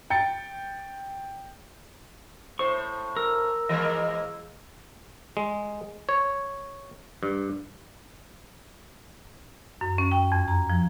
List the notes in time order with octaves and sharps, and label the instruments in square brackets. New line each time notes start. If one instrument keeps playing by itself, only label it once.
[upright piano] G5 A6 C#7
[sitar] A2 C5 [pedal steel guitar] C#6
[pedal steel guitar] A#4 [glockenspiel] E6
[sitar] E3 G#3 A#3 [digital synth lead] D#5
[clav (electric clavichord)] G#3
C#5
G2
[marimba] F#2
C#4
G5
F2
A#5
F3